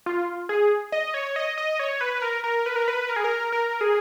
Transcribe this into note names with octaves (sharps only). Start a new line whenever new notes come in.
F4
G#4
D#5
C#5
D#5
D#5
C#5
B4
A#4
A#4
B4
A#4
B4
A#4
G#4
A#4
A#4
G#4